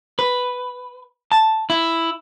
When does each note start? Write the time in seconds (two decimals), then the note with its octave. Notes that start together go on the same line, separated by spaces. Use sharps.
0.19 B4
1.32 A5
1.70 E4